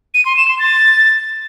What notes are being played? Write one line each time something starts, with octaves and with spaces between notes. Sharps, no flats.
D#7
C6
E7
C6
A6